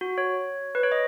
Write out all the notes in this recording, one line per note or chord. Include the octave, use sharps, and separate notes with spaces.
F#4
C#5
B4
C#5
D#5